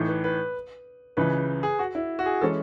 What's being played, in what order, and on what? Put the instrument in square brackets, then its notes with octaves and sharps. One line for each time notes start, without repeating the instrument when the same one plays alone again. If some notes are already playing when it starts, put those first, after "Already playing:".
Already playing: [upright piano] A2 E3 A3 D#4
[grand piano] B4
B4
[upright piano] C#2 C#3 E3 [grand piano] B4
[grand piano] G#4
F#4
E4
F#4
G#4
[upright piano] E3 G#3 C#4 [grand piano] A4